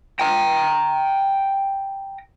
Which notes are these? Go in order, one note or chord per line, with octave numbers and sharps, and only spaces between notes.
G5 A#5